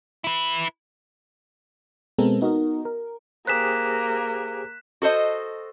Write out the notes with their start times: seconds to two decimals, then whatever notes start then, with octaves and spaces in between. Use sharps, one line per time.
0.24 E4 B4
2.18 B2 G#3 B3 C4 A4 A#4
2.41 B3 D#4 F#4 A#4 D#5
2.85 A#4
3.47 A#3 G4 G#4 C5 F#6 B6 E7
5.02 F#4 A4 C5 D#5